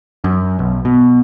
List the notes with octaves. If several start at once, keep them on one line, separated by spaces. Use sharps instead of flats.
F#2
B1
B2